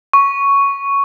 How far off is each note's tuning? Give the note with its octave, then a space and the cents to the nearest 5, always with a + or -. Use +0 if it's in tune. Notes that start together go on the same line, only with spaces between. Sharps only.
C#6 +5